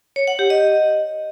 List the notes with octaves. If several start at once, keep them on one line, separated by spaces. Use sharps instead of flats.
C#5
F#5
G4
D#5